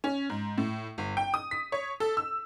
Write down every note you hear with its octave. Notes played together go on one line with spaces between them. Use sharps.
C#4
G#2
A2
G1
G5
D#6
B6
C#5
A4
E6